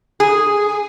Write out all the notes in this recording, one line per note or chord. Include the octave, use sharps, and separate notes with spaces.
G#4